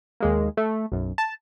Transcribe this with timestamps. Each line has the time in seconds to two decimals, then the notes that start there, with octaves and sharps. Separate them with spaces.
0.20 D#2 G#3 A#3
0.57 A3
0.92 B1 F#2
1.18 A5